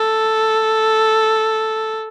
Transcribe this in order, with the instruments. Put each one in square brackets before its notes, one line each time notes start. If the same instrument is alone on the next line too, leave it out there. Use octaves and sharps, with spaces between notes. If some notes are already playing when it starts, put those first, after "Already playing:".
Already playing: [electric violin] A4